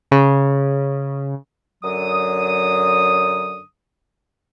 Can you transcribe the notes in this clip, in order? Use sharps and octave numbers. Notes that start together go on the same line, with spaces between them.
C#3
F#2 D3 F#3 D#6